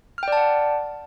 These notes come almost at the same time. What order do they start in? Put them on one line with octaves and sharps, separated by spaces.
F6 G5 D5 A5 F#5